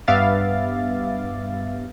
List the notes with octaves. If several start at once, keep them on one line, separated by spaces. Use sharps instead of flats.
G2 B3 E5 F5 D6 A6